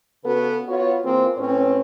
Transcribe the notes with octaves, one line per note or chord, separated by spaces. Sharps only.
C#3 B3 F#4 A4 B4
B3 F4 F#4 C#5
E3 A#3 C4 F4 G#4
A2 C4 C#4 B4 C#5